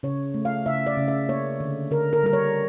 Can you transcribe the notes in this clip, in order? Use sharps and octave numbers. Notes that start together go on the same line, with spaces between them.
C#3 C#5
A3
F5
C#3 E5
D5
C#3
E5
A#3 C#5
D3
D3 A#4
A#4
G3 A#4
C#5